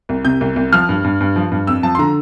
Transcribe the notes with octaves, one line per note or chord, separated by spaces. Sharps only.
C2
C3 G6
C2
C2
F3 F6
G2
G2
G2
F3
G2
F2 E6
F3 A5
C6
D3 A#5